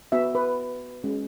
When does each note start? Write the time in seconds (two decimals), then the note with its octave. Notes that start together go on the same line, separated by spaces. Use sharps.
0.12 B3 F#4 E5
0.35 B4
1.04 G#3 C#4 F#4